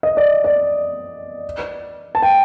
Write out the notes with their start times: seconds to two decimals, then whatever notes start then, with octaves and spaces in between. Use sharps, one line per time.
0.03 D#5
0.17 D5
0.44 D5
2.15 A5
2.22 G5